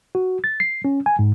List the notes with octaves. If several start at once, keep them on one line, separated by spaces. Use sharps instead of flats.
F#4
A6
C7
C#4
G#5
G#2